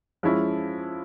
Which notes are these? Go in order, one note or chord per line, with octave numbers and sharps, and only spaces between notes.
F3 G#3 C#4 E4